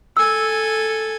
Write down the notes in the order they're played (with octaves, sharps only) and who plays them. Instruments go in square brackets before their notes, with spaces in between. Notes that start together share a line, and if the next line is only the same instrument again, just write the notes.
[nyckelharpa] A4 G#5 [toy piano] E6